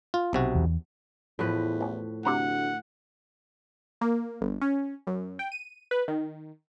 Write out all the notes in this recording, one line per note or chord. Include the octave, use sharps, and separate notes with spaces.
F4
B1 C3 F#4
E2
E2 A2 F3 B4
A1
D2 C3 C5 F#5 A#5
A#3
G1
C#4
F#2
G5
D#7
B4
D#3